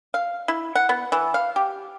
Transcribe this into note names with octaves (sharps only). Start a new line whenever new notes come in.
F5
E4
F#5
B3
E3
F5
G4